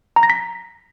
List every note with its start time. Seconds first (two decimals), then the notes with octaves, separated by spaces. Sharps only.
0.16 A#5
0.23 A#6
0.30 B6